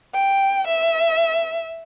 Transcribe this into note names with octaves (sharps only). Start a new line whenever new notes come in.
G5
E5